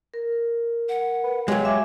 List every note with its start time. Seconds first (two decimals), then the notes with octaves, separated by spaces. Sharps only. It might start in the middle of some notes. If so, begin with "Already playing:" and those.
0.14 A#4
0.89 F#5
1.24 B4
1.48 F#3 G#3 G4 B4 C#5 F5
1.65 E5 G#5 D6